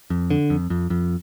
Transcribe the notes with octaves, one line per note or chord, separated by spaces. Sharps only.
F2
D3
F2
F2
F2